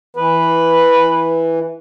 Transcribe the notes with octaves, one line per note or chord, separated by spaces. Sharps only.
E3 B4